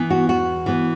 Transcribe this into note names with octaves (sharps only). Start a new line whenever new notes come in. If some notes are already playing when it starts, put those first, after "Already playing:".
Already playing: E3 B3
F#4
E2 F#4
E3 B3